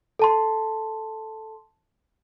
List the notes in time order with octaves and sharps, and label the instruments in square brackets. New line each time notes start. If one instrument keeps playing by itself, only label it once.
[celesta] A4 A5 C6